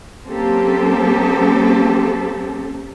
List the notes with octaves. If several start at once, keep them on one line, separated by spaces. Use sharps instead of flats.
F#3 A#3 C4 C#4 G4 A4